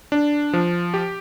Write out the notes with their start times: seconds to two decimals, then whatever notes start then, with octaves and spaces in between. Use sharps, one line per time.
0.12 D4
0.53 F3
0.94 G4